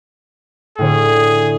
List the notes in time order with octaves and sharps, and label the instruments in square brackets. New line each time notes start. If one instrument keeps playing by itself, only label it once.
[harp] A2 D3 C#5 [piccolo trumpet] G#4